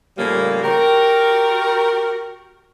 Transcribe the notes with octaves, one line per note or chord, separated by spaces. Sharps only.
A2 C#3 F3 G3 A#3
F#4 G4 A#4